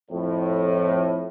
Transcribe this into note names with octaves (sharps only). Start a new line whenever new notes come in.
F2 A2